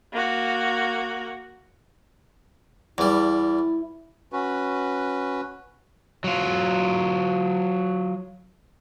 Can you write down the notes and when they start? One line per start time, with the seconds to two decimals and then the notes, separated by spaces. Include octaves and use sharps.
0.12 A#3 F#4
2.98 E2 G3 E4
4.33 C#4 F#4 B4
6.24 F#3 F4